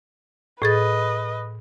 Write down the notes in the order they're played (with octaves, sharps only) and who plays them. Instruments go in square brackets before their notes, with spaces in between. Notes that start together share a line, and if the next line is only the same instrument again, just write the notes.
[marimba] A2 G#4 A6 [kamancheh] B4 D#5